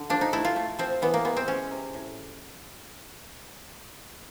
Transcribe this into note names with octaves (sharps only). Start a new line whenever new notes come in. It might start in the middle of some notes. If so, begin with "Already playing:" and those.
Already playing: D3
F3 D4
D#4
A3 E4
F4
A3
F3 C4
E3 B3
A#3
G#3 B3
C4
G#3 C#4
C3
A2